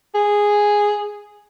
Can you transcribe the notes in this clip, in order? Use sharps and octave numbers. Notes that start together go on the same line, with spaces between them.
G#4